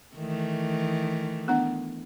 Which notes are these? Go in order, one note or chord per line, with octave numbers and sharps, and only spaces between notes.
D#3 E3 A3
B3 D4 F#5